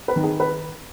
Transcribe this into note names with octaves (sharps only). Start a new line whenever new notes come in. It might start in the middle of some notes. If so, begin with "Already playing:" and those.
B4
D#3
G#4
B4